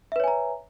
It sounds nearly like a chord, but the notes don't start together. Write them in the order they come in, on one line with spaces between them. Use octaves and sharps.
E5 B4 C#5 G#5 A#5